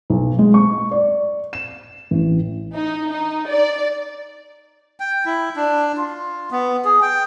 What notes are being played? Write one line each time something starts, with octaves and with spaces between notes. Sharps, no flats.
B1
G#3
C#6
D5
E7
A1
D#4
D#4
D5
G5
E4
D4
F4
B3
G#4
G5